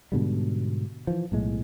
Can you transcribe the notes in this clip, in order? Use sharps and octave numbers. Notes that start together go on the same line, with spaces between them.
G#2 B2 D3 G3
E3 F3
B1 A2 G#3